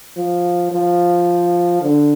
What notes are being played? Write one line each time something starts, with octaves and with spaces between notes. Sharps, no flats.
F3
F3
D3